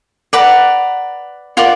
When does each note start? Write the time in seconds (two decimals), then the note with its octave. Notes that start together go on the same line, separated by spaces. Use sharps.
0.33 B4 D5 F#5 A#5
1.57 F4 A#4 D5 F#5